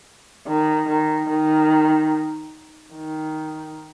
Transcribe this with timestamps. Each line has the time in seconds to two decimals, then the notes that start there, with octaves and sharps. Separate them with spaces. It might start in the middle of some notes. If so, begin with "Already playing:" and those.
0.47 D#3
0.88 D#3
1.29 D#3
2.94 D#3